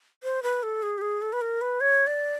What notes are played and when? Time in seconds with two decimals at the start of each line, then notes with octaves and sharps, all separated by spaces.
0.23 C5
0.43 B4
0.63 A4
0.83 G#4
0.98 G4
1.02 G#4
1.22 A4
1.33 B4
1.41 A#4
1.61 B4
1.81 C#5
2.07 D5